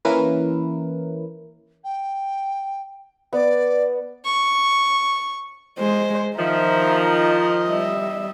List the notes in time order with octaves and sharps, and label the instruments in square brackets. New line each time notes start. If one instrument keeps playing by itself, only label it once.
[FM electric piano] E3 A#3 C#4 E4 A#4 B4
[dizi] G5
[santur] B3 [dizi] D5
[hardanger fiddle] C#6
[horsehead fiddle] G#3 [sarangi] C5
[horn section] D#3 F3 [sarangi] E5 [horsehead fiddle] A#5
[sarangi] D#5
[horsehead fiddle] G3 E5